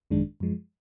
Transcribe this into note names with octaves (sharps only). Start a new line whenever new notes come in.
G#1 F#2 D#3 G#3 D4
F#2 F3 G#3